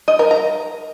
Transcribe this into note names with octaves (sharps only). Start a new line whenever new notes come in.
D#5
A#4
A#5